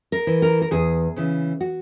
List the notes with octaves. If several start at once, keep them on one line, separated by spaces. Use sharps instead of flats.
A#4
E3
A#4
A#4
E2 G#4
C#3 E3
F#4